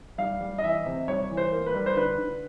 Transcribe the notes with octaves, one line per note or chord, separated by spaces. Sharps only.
G3 F5
G3
D#5
E3 E5
C3
G3 C#5
E3
C5
A#3
B4
G3
C5
D3 B4
D3